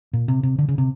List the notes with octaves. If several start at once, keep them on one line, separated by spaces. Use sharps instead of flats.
A#2
C3
C3
D3
C#3
C3